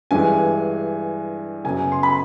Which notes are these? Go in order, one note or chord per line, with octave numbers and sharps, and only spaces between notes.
G2 E3 G#3 G#5
F#2 C#3 F#3 B3 G#5
C6
B5